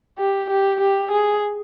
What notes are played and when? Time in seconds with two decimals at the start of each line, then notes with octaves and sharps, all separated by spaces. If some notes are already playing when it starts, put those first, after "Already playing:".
0.19 G4
0.50 G4
0.80 G4
1.11 G#4